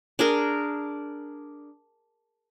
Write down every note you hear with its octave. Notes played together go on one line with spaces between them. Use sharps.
D4 G#4 A#4